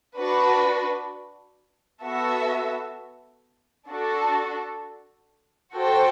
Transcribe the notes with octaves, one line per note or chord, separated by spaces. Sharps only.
D4 F#4 B4
B3 F#4 A4 E5
D4 F#4 A4
F#4 A4 C5 G5